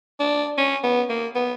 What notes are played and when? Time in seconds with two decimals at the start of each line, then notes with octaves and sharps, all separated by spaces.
0.20 D4
0.58 C#4
0.83 B3
1.09 A#3
1.35 B3